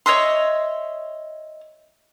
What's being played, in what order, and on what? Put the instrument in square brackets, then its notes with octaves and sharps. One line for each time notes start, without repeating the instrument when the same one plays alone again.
[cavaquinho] C#5 D#5 E5 C6